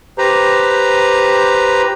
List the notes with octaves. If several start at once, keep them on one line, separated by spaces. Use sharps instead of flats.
G4 B4 C5 A#5